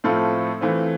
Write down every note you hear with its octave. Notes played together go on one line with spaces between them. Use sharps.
A2 F3 C4 F4 A4
E3 A3 C4 F4